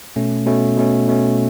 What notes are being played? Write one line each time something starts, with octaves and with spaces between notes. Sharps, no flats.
B2 A3 C#4
B2 A3 C#4
B2 A3 C#4
B2 A3 C#4